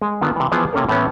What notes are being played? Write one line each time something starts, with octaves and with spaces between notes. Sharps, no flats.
G#3
D3 D#3 B3 F4
C3 E3
E3 F3 B3 G#4
C3 A#3 C#4 A4 A#4
A2 E3 A3 B3 C#4